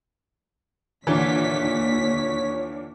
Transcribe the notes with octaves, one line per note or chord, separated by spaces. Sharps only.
D#2 A#2 D3 E3 C#5 B6